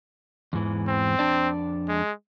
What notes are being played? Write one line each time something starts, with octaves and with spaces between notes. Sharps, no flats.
E2 G#2 E3
C4
F2 D4 D5
G#3